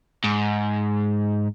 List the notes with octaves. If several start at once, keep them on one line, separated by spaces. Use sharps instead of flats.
G#2